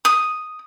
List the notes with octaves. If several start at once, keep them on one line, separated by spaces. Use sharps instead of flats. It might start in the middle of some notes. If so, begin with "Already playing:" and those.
D#6